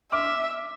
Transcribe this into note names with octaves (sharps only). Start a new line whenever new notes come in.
E5 D6 F6